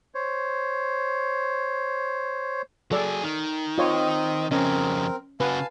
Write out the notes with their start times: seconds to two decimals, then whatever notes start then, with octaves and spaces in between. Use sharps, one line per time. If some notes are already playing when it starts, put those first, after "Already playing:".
0.15 C5 C#5
2.92 F#3 G#4 A4 D5
3.23 D#3
3.78 C4 F4 C#5 D#5
4.51 F2 C#3 C4 C#4 A#4 D#5
5.40 C#3 F#4 B4 F5 G#5 A5